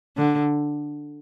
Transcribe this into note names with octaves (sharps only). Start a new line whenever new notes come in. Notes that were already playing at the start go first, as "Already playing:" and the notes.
D3